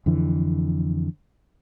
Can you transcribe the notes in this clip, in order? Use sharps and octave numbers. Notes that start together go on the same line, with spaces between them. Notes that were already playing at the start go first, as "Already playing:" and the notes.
F2 D3 E3